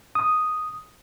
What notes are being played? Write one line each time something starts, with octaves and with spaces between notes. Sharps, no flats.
D#6